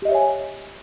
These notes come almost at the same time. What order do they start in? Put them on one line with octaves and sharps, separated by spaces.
G4 D#5 E5 C#5 G#5